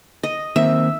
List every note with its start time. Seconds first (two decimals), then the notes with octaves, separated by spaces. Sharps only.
0.23 D#5
0.56 D#3 A#3 C4 E5